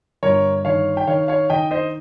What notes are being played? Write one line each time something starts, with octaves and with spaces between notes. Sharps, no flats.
G1 A#4 C#5
D#3 C#5 F5
G5
D#3 C#5 F5
C#5 F5
D#3 D#5 G5
C5 D#5